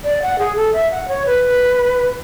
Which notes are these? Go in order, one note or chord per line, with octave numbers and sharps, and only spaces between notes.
D5
F#5
G#4
A4
E5
F#5
C#5
B4